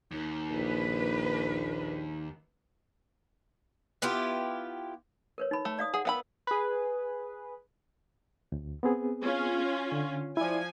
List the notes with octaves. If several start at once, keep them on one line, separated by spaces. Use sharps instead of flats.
D#2 D#4
A#1 B4
B3 E4 F4 G4
A#4 B4 C#5
D#4 B5
A3
D5 F5 D#6
G#4 F#5
B3 A#4 F5 F#5 B5 E6
G#4 B4
D2
B3 C4 G#4
C#4 F4
D3
F3 E4 D5 G#5